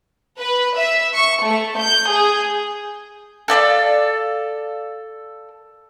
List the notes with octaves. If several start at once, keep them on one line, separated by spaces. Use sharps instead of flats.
B4
E5
C#6
A3
G6
G#4
A4 D5 D#5 F5